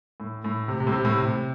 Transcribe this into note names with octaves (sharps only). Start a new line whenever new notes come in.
A2
A2
C3
C3
A2
C3
A2
C3